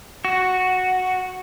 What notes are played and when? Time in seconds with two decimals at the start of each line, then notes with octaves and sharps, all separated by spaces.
0.25 F#4